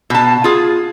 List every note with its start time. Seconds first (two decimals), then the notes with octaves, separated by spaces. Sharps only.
0.10 B2 A5
0.44 F4 G#4